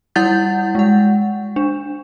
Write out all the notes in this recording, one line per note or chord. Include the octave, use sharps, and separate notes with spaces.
G3 E4 F#5 G6 A6
G#3 F#5
D4